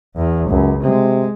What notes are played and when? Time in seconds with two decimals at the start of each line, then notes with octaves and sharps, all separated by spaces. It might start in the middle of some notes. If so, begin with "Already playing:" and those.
0.16 E2
0.50 C#2 F#2
0.83 C3 G#3